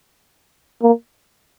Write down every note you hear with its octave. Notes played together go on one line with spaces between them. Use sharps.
A#3